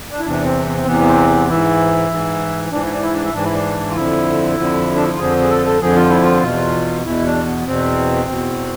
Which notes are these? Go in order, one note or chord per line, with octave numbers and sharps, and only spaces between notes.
D4
E4
E2 C3 E3 D4
C4
C4
C4
E2 C3 E3 B3
B3
C4
G#2 E3 E4
G#2 E3
G#2 E3 D4
E4
D4
E4
D4
E4
G#2 E3 D4
E4
D4
F4
F2 D3 F3 E4
F2 D3 F3
D4
E4
F4
F2 D3 F3 G#4
G#4
A4
A4
F2 D3 F3 G#4
F4
E4
F4
E2 B2
E2 B2 E4
D4
B3
E2 B2 C4
E2 B2